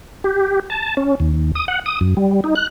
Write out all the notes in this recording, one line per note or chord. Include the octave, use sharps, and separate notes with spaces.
G4
A5
C#4
D#2
D#6
F#5
D#6
F#2
G3
D#4
F#6